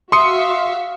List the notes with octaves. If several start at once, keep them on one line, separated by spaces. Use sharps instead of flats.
F#4 E5 F5 C6 D#6 C#7